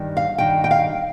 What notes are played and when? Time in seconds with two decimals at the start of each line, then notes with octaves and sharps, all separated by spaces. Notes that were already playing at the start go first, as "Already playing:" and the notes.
Already playing: G2 D#3
0.17 F5
0.38 G2 D#3 G5
0.64 G5
0.71 F5